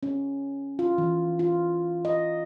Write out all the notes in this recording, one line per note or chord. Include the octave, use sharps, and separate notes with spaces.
C#4
F4
E3
F4
D#5